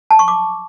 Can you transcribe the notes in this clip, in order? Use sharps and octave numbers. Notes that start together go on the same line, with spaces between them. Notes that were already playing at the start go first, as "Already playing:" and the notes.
A5
C#6
D6